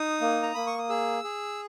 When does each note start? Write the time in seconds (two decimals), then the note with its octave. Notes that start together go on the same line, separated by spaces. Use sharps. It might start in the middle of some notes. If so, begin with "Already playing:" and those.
Already playing: D#4 D#6
0.21 A#3
0.43 A#5
0.54 A#3 B5
0.67 C#6
0.78 D#6
0.89 G#4 E6
1.24 G#4